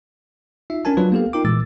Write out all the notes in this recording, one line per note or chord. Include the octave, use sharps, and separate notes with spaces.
D#4 F4 E5
C#4 D4 A#4 G#5 A5
F#3 D4 F4 B4
A#3 B3 G4 A4 F5
D#4 F4 A#4 G5 D6
A#2 E3 G#3 D6 E6 A6